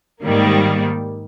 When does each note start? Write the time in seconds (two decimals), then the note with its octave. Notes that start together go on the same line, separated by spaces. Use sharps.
0.23 G#2 D#3 G3 A#3